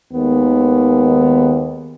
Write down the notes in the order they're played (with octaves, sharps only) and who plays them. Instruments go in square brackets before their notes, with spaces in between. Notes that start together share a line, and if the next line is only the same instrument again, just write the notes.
[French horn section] D#2 D#3 G#3 B3